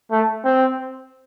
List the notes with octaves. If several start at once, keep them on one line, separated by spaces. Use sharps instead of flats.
A3
C4